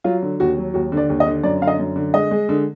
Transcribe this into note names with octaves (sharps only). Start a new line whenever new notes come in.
F#3 F4
D3
D#2 F#4
F#3
D#2 F#4
D3
D5
D#2
D#5
D3
F#2 D5
D3 F5
D#5
F#2
D3
G#3 D#5
G#3
D3